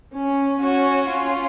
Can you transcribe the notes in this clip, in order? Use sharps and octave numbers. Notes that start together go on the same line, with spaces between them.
C#4
C#4 F#4
C#4 F4